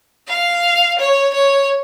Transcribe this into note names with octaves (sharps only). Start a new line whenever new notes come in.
F5
C#5
C#5